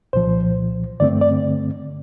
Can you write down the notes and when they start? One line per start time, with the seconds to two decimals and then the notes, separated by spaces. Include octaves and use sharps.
0.13 C2 A#2 F3 C5
1.00 G2 D3 A3 C4 D5
1.21 D5